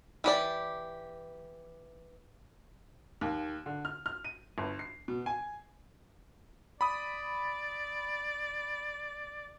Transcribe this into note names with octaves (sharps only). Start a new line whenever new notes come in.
E3 G4 D5
D#2
D3
F6
F6
D#7
G1
C7
B2
G#5
D5 B5 D#6